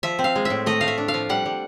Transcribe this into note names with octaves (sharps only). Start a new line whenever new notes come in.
F3 E5
C4
F5
G#3
A2 E5
A3 D#5
A3 F5
E5
D4
F5
F3
G3 F#5
G3